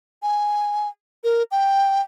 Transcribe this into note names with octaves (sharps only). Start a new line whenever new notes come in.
G#5
A#4
G5